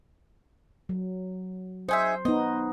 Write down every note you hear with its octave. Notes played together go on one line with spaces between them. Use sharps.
F#3
D#4 G#4 C5 E5
B3 D#4 D#5